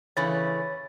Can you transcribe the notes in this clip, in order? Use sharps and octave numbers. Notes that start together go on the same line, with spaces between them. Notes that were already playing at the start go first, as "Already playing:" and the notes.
C#3 E3 A3 C#5 A6